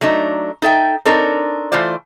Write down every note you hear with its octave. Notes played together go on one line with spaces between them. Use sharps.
F#3 A3 D4 D#4
D#4 A4 E5 G5
C4 D4 D#4 A4 A#4 C#5
E3 A3 F4 C5 D5